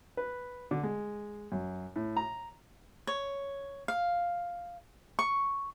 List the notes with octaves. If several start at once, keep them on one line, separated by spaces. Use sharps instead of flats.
B4
D3
G#3
F#2
A2
A#5
C#5
F5
C#6